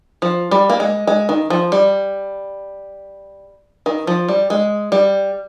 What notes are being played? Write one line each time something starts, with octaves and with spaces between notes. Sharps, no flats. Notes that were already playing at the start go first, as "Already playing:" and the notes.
F3
G3
A#3
G#3
G#3
D#3
F3
G3
D#3
F3
G3
G#3
G3